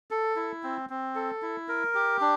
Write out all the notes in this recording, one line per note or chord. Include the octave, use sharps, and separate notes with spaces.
A4
E4
C4
C4
A4
E4
A#4
G4
D4